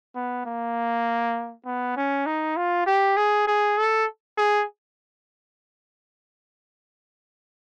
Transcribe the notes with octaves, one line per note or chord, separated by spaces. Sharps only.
B3
A#3
B3
C#4
D#4
F4
G4
G#4
G#4
A4
G#4